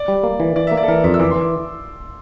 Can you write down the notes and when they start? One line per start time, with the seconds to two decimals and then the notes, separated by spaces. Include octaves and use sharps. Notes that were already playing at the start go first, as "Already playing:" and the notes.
Already playing: D5
0.08 G3
0.24 A#3
0.40 E3
0.56 E3 D5
0.67 E5
0.72 A#3
0.77 D5
0.83 A4
0.88 E3 A#4
1.04 F2 E5
1.14 E6
1.20 E3 D6
1.30 C6
1.36 E3
1.41 D6